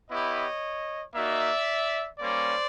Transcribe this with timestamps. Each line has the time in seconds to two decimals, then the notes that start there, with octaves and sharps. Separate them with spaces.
0.10 B3 E4 G4 C#5 D#5
1.15 A#3 D#4 F#4 D5 E5
2.19 G3 A#3 C#4 C5 D5